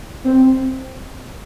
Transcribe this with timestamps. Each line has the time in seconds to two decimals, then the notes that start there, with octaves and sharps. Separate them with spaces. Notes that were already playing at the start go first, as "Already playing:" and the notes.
0.24 C4